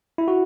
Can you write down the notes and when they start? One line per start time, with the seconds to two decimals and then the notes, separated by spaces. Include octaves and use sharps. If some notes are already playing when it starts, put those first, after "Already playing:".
0.18 E4
0.28 F#4